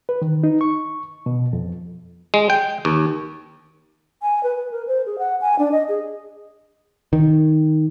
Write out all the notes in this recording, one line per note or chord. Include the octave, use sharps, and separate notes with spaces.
B4
D#3
D#4
C#6
B2
F2
G#3
G5
D#2
G#5
B4
B4
A#4
C5
G#4
F#5
G#5
D4
D#5
G#4
D#3